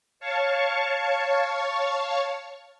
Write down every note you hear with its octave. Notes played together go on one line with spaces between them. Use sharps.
C#5 F5 A5 C#6